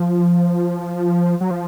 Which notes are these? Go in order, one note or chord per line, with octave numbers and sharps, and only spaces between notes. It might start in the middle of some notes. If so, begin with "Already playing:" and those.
Already playing: F3
F#3
F3